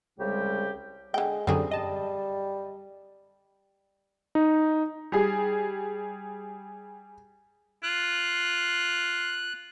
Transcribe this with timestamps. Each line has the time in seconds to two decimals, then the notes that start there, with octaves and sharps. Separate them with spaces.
0.19 C2 C#3 G3 G#3 G4
1.14 D3 G#3 G5
1.47 F#2 D3 F#3 G3 C4 G#4
1.71 G3 D#5 A5
4.35 D#4
5.12 G3 G#4
7.83 F4 F#6